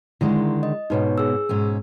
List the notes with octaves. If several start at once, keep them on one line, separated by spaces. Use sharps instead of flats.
D3 D#3 G#3 E4
D#5
G#2 B2 D#4 B4 C#5
G#4 E6
G#2 B2 C#4